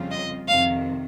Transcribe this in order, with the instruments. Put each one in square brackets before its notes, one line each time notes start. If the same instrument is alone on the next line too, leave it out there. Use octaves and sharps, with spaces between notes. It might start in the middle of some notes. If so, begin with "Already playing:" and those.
Already playing: [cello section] F2 C#3 G3 C4 F4
[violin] D#5
[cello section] F2 C3 D#3 [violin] F5